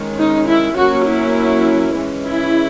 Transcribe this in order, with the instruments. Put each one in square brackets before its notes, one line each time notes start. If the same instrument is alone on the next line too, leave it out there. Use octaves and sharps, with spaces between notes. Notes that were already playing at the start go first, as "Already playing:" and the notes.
Already playing: [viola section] D#3 G#3 C#4
D#4
E4
F#3 A#3 C#4 F#4
E4
E3 G#3 C#4
E4